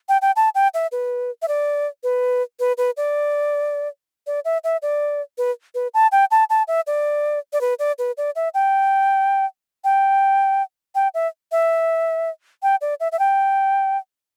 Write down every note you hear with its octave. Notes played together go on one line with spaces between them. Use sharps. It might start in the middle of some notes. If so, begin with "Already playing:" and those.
G5
G5
A5
G5
E5
B4
E5
D5
B4
B4
B4
D5
D5
E5
E5
D5
B4
B4
A5
G5
A5
A5
E5
D5
D5
B4
D5
B4
D5
E5
G5
G5
G5
E5
E5
G5
D5
E5
E5
G5